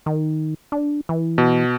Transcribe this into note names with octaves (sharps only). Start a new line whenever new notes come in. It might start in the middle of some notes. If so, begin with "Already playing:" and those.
D#3
D4
E3
B2